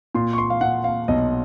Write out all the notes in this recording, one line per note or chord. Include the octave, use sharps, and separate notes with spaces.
A#2 C6
C#6
C6
F5
A#2 F#5
F5
B1 D#5